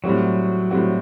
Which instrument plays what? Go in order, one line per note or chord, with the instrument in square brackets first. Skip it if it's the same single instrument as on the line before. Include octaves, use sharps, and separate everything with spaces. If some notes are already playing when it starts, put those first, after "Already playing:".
[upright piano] A2 G3 C4 F#4 [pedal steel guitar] F#3
[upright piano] A2 G3 C4 F#4